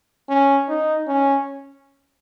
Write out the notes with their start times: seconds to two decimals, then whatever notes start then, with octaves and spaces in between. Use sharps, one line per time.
0.29 C#4
0.69 D#4
1.08 C#4